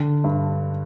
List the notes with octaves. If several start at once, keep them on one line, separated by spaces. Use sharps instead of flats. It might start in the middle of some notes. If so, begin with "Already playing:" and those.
Already playing: D3
G2